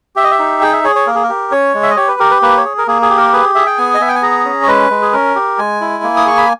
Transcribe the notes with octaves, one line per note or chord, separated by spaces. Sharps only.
G4 E5
D#5
E5
D#4
G#4 G5
E5
G#4 C#5
C#5
A#3 A#4
G#4
A#4
G4
C#4 C#5
G#3
E5
D#5
G4 C#5
B4
G4 A#4
B4
A#3 B4
C#5
G#4
A#4
A#3 G#4
G#4
G4
A#4
G#4 B4
G#4 E5
G5
B3 G#5
D#5
B3 E5
G5
G#5
G#4 A#5
C#4
C#5
G#3 B4
G#3
G#4
C#4 A#4
G4
G#3 G#5
E4
A#3
D#6
G#4 C#6
B5